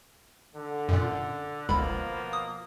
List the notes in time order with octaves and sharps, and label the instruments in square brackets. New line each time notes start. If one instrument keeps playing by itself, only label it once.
[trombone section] D3
[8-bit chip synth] F#2 A#2
[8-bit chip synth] G1 C#2 B5 [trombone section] B2 F3 A#3
[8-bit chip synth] D#6